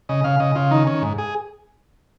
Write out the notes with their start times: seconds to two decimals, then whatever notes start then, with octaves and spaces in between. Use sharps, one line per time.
0.09 C#3 D#5
0.24 C#3 F5
0.40 C#3 D#5
0.55 C#3 F4
0.71 D#3 D#4
0.87 D#3 C#4
1.02 G#2
1.18 G#4